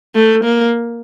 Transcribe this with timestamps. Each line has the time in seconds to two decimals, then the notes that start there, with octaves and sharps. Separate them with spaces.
0.15 A3
0.44 A#3